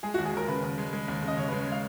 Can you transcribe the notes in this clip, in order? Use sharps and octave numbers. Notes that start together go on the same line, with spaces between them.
G#3 G#4
F#4
D#2
G#4
D#2 A#4
C#3 B4
D#2
G#3
G#3
D#2
C#3
D#5
C#3 C#5
B4
G#3
C#5
G#3 F5